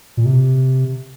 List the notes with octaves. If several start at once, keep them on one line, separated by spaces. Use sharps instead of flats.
A#2
C3